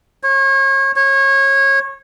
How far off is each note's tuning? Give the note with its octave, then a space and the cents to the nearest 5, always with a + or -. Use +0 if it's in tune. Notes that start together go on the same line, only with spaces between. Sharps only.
C#5 -35
C#5 -25